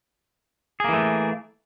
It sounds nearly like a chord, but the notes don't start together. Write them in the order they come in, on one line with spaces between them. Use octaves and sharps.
G#4 A#3 E3 A3